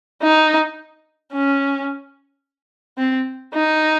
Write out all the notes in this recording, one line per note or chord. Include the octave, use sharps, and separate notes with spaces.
D#4
C#4
C4
D#4